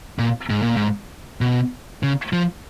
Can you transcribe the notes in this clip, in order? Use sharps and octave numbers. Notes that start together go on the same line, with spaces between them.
A#2
G#2
A#2
G#2
B2
C#3
F3